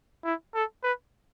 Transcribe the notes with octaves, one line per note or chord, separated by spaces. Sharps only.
E4
A4
B4